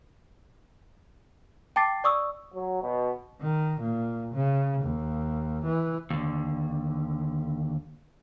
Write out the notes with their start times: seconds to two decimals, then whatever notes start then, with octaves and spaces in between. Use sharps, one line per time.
1.76 G5 A5 D6 A6 C7
2.04 D5 C#6 D#6 E6
2.54 F#3
2.82 B2
3.42 D#3
3.81 A#2
4.35 C#3
4.82 D#2
5.65 E3
6.10 D#2 D3